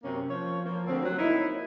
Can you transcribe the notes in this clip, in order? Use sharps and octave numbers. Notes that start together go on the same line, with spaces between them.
F#2 C3 A#3 C#4
F3 C#5
F3 A#3
D2 C4
F#3
A#3 D#4 E4